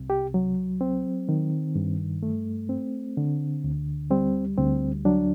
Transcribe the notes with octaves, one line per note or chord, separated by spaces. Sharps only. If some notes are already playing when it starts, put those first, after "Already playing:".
Already playing: C2 C3
G4
F#3
C4
D#3
G2
A3
C4
D3
D2
G3 C4
D2 C4
F#3 D4